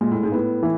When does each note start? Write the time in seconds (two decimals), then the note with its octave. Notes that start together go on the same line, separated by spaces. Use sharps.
0.01 A#2 G#3
0.11 A2
0.23 G#2
0.32 A2 B3
0.63 E3